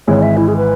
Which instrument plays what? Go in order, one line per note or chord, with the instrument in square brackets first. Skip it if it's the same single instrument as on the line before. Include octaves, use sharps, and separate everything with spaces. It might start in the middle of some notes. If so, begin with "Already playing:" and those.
[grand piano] G#1 G#2 E3 G#3 [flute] C#5
[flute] E5
E4
G#4
B4